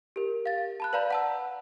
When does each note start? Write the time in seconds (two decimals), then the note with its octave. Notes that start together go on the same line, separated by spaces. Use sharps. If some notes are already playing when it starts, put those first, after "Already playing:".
0.16 G4 A#4
0.46 F5 A6
0.80 A5 B5 F#6
0.93 B4 D5 F5 A#5 B5 G6
1.11 F#5 A5 E6